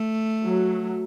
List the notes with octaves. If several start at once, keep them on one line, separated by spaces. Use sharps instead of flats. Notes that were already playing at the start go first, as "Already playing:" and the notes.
Already playing: A3
F#3